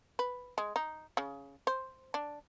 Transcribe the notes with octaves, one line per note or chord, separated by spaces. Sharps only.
B4
G#3
D#4
C#3
C5
D4